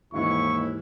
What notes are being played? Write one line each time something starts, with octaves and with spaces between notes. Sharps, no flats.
D#2 G#2 E3 E4 C#6